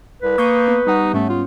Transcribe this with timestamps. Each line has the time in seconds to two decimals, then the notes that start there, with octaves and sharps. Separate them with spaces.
0.22 C2 B4
0.38 A#3 C#6 D#6 G6
0.68 B3
0.87 G3 D#4 F#5
1.14 G#2 A3 C#4
1.29 F4